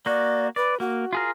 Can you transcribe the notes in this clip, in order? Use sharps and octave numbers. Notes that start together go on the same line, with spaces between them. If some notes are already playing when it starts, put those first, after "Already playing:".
A#3 F#4 D5
B4 D5
A#3 F#4
F4 G#4 A#4